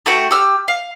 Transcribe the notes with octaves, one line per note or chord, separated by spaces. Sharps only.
A3 F#4 F#5 G5
G4 E6 F6
F5